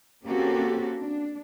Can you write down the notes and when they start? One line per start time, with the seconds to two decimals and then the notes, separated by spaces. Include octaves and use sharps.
0.24 A#3 C4 C#4 F#4 G4 A4
0.98 D4